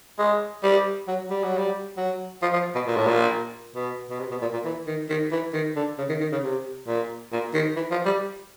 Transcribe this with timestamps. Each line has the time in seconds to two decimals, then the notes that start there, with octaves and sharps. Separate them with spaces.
0.19 G#3
0.63 G3
1.08 F#3
1.30 G3
1.44 F#3
1.58 G3
1.97 F#3
2.42 F3
2.53 F3
2.75 B2
2.87 A#2
2.97 A2
3.07 A#2
3.75 B2
4.10 B2
4.20 C3
4.31 B2
4.42 A#2
4.53 A#2
4.65 E3
4.87 D#3
5.09 D#3
5.32 E3
5.54 D#3
5.76 D3
5.98 C#3
6.09 D#3
6.21 D#3
6.32 C#3
6.43 C3
6.87 A#2
7.32 A#2
7.54 D#3
7.76 E3
7.91 F3
8.06 G3